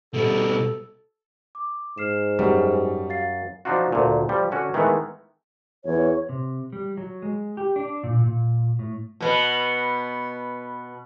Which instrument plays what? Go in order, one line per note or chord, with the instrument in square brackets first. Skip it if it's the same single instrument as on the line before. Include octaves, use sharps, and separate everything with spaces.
[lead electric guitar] B2 G3 [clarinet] A4
[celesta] D6
[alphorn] G#2 [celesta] F6 C7 E7
[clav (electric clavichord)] F#2 [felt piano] G3
[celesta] F5 A6 C7
[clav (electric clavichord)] F3 F#3 D4 D#4 F4 F#4
D2 A#2
F3 G3
D3 C#4 F#4
D#3 E3 G#3 A3 B3
[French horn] E2 [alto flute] C#5
[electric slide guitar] C3
G3
F#3
G#3
G4
D4
A#2
A#2
A2
[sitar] B2 B3